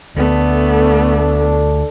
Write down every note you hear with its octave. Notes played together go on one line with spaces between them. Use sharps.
D2 A3 B3 D4 A4